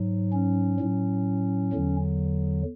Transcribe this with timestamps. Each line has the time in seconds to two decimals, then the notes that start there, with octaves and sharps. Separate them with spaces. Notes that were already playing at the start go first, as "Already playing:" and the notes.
Already playing: G#2 F#3
0.33 C#4
0.80 A2 F#3
1.73 E2 D3 F#3